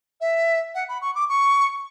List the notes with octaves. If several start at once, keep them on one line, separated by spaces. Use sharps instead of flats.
E5
F#5
B5
C#6
D6
C#6